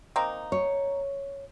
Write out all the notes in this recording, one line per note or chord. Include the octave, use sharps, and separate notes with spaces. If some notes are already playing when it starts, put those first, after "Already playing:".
A#3 C4 D#4
C#5